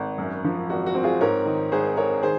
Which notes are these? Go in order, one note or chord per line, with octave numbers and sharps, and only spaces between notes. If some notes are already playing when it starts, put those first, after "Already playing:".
Already playing: G#1
F#2
F3
G#1 F#4
F#4
C4
F4 G#4
G#2 A#4 C#5
D#3
G#1 G#4 C5
G#1 A#4 C#5
D#3 G#4 C5